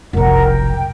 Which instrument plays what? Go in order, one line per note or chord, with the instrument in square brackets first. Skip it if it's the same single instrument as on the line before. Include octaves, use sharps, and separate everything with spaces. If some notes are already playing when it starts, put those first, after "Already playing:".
[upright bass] F1 B1 [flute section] A#4 F#5
[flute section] G5